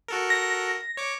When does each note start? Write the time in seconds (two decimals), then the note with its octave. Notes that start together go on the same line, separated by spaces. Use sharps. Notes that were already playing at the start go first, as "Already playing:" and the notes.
0.08 F#4 A4 A#4
0.30 A#6
0.97 C#5 D6